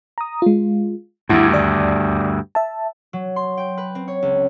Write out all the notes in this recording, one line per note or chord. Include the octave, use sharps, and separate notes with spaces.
A#5 D#6
G#3 F4
D2 G2 E4 F#5 G#6
D#2 D5
E5 A5
F#3
C6
G5
B4
C4
C#5
C#2